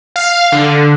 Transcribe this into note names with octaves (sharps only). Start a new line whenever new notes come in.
F5
D3